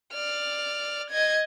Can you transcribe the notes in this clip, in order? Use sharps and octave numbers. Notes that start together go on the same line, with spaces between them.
D5 F6
D#5 G#6